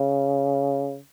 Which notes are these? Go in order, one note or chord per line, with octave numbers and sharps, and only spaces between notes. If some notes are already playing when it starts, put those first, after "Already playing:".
Already playing: C#3